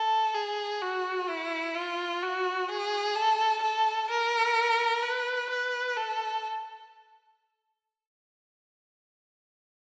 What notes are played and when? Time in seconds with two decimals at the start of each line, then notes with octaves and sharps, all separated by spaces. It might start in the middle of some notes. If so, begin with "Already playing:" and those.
Already playing: A4
0.34 G#4
0.81 F#4
1.28 E4
1.75 F4
2.22 F#4
2.69 G#4
3.16 A4
3.62 A4
4.10 A#4
5.03 B4
5.49 B4
5.97 A4